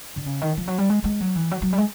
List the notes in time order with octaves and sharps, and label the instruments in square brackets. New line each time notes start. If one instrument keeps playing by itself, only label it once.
[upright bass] D3
C#3
D#3
F3
F#3
G3
G#3
G#3
F#3
E3
F#3
F#3
G3
G#3